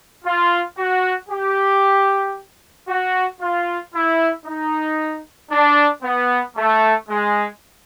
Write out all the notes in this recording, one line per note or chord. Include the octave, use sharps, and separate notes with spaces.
F4
F#4
G4
F#4
F4
E4
D#4
D4
B3
A3
G#3